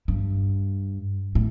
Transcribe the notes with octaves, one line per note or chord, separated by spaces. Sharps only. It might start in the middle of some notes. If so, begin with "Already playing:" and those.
G2
A2